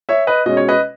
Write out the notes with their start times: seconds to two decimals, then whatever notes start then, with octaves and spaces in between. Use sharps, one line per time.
0.09 C#5 E5
0.27 B4 D#5
0.46 B2 G#3 C#4 D#5
0.57 C#5
0.68 B4 D#5